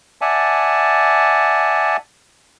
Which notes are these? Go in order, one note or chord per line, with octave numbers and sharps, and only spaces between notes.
D5 E5 F#5 G#5 A5